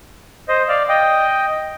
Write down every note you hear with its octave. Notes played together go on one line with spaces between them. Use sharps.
C5 D#5
D5 F5
D#5 G5